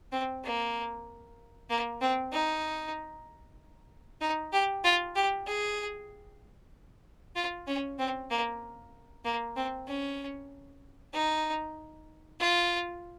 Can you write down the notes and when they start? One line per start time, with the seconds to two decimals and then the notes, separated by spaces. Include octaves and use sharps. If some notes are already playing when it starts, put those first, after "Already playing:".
0.12 C4
0.44 A#3
1.70 A#3
2.01 C4
2.32 D#4
4.21 D#4
4.53 G4
4.84 F4
5.15 G4
5.47 G#4
7.36 F4
7.67 C#4
7.99 C4
8.30 A#3
9.25 A#3
9.56 C4
9.87 C#4
11.14 D#4
12.40 F4